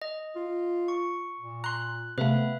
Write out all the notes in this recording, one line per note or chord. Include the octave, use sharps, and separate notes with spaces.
D#5
F4
C#6
A#2
A#5 C6 F#6
C3 A3 B3 B4 E5 F5